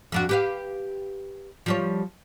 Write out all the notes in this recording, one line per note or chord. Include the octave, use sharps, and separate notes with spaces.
F2 D4 F#4
G4 B4 F5
F3 G3 C#5